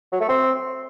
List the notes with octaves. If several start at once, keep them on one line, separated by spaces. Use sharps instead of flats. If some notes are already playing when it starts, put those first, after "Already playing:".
F#3
A3
C4